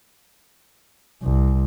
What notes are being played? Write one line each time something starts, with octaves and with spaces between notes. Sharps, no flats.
C2